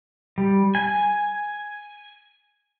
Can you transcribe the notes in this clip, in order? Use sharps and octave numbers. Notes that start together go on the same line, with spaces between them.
G3
G#5